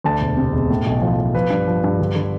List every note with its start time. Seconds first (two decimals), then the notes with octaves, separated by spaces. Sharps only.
0.04 D2 A5
0.21 E1
0.37 C3
0.53 E1
0.70 A2
0.87 B1
1.02 F3
1.18 F3
1.35 F3 B4
1.50 G2
1.67 F3
1.84 G2
1.99 D3
2.15 D3